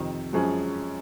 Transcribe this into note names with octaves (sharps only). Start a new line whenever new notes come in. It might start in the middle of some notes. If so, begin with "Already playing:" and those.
Already playing: F2 C3 D#3
F#2 F3 G#3 C#4 G#4